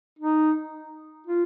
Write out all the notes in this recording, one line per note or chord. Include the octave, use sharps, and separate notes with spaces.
D#4
F4